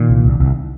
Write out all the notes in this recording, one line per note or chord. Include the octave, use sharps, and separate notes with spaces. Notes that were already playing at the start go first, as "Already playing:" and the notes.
Already playing: A#2 D#3
C2
C2
C2